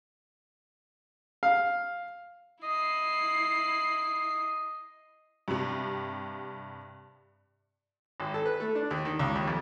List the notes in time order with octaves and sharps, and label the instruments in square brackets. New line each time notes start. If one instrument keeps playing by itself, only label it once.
[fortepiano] F5
[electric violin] E4 C7 [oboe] D#5
[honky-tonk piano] G2 C3
[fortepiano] G#1
A4
B4
A3
D4
D#2
D#3
C#2
D#2
F2